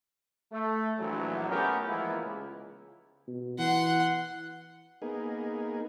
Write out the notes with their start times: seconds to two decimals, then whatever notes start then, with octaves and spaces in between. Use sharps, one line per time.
0.52 A3
0.99 A#1 E3 F#3
1.49 A3 B3 C#4 F4 G4 A#4
1.88 E3 F3 G#3 A#3 B3 E4
2.23 C#2
3.27 B2
3.58 E3 F#5 C6
5.02 A#3 B3 D#4 G#4